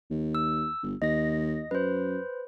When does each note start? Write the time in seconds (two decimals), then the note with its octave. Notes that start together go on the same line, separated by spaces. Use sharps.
0.10 D#2
0.35 E6
0.83 G1
1.02 D#2 D#5 A#6
1.71 F#2 B4 C5